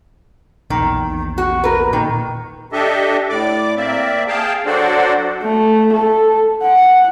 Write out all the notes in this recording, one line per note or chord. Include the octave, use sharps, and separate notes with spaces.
A#1 E2 D#3
F#4
A#4 B4
A#2 D#3
D4 G4 A4 D#5 E5
A2 D5 D6
A#3 C4 D5 E5
G#4 F5 G5 A5
F#3 D4 F#4 A4 C5 D5
A3
A4
F#5